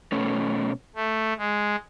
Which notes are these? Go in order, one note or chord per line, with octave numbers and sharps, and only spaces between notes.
B2 A3 C#4
A3
G#3